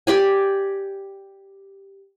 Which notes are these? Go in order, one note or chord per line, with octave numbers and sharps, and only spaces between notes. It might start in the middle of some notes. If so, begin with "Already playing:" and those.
G4 D5 G#5